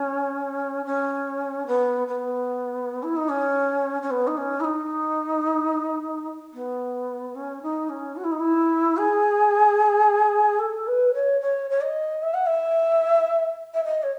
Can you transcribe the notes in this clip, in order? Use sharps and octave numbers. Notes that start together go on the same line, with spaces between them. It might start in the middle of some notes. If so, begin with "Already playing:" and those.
Already playing: C#4
C#4
B3
B3
E4
D#4
C#4
C#4
B3
D#4
C#4
E4
D#4
B3
C#4
D#4
C#4
F#4
E4
D#4
E4
G#4
A4
B4
C#5
C#5
C#5
D#5
E5
F#5
E5
E5
D#5
C#5